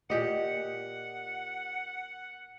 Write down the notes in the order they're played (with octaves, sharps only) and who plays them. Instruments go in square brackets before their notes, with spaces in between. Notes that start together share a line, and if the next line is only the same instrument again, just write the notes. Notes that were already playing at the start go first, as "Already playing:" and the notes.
[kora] A#2 G4 D#5 [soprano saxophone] F#5